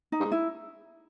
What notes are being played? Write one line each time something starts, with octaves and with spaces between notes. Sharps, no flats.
D#4
G2
G#2
E4